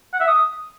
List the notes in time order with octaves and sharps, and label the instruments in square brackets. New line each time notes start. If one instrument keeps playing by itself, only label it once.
[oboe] F#5
E5
D#6